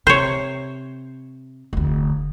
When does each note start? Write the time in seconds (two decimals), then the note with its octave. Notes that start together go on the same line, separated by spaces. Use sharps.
0.07 C3 C5 C#5
1.73 F1 D2